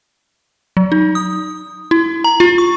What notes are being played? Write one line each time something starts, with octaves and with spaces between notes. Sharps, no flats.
F#3
D#4
D#6
E4
A#5
F4
C#6